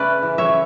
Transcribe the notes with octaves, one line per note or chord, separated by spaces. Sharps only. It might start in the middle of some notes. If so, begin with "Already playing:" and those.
Already playing: C#3 A3 C#4 B4 D5 E5
E3
C#5 E5